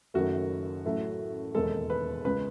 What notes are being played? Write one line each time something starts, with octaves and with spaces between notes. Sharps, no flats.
F#1 F#2 D#3 A3 F#4
A1 A2 F#3 A3
E1 D#2 D#3 G#3 A4
B4
C#2 C#3 G#3 B4